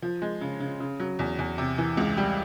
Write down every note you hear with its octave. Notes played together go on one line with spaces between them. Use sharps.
F3
G#3
C#3
C#3
C#3
F#3
E2
E2
C3
E3
C#2
G3